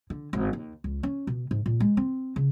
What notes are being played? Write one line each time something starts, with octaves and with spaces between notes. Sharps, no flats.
D3
G#1
D#2
C#2
C#4
B2
G#2
A#2
G#3
C4
C#3